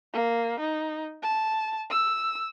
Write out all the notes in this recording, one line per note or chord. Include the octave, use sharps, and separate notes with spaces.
A#3
D#4
A5
E6